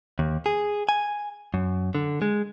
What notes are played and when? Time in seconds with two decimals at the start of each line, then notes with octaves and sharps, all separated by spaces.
0.19 D#2
0.46 G#4
0.89 G#5
1.54 F#2
1.95 D3
2.22 G#3